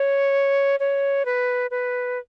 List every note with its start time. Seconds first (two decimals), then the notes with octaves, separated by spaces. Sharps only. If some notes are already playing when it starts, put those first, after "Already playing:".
Already playing: C#5
0.80 C#5
1.25 B4
1.71 B4